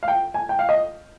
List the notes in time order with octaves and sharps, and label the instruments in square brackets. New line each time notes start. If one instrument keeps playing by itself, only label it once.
[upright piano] F5
G5
G#5
G5
F5
D#5